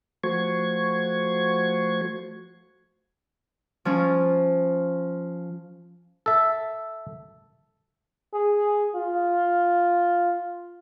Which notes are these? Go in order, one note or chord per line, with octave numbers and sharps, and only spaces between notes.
F3 A3 F#4 C5 C#6 G#6
F3 C#4
A4 E5
G#4
F4